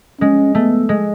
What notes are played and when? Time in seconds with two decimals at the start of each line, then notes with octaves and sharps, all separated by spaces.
0.20 G#3 C#4
0.55 A3 B3
0.89 G#3